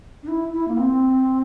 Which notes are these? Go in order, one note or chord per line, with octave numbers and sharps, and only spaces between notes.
D4
E4
E4
A#3
C4